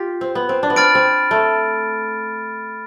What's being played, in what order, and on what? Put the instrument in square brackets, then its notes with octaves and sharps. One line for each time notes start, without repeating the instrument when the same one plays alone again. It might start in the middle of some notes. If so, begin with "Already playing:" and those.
Already playing: [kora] F4 G4
C4
B3
C4
D4
B3
[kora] C4 [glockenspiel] B5 F6 A6 D7
[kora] C4
A3